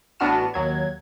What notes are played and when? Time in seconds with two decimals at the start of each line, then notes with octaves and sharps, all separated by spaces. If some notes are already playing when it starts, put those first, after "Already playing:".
0.20 A1 B3 D4 F#4 F6 E7
0.54 D#2 F#3 G#6